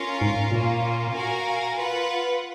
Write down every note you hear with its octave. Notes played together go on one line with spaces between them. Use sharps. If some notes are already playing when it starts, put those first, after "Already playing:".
Already playing: C#4 F4 A#4 F5
G#2
A#2 A#3 C#4 F4
F#4 A#4 F5 G#5
F4 B4 F#5